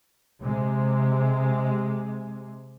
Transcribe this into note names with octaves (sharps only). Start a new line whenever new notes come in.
C3 G#3